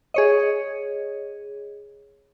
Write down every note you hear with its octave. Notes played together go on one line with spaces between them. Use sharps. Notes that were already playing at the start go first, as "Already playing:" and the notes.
G#4 C#5 D#5